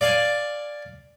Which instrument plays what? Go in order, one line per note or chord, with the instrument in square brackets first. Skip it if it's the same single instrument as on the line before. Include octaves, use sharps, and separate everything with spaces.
[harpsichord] D5 F5 G#5